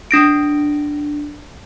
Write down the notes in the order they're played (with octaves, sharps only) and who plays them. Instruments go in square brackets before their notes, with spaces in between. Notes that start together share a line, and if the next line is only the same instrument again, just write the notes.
[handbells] D4 A#6 D7